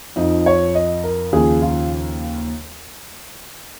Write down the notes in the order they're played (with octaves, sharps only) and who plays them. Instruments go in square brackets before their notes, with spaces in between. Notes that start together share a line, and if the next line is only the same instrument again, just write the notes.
[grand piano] F2 F3 D#4
C#5
D#5
A#4
D#2 C#3 F3 G#4
F4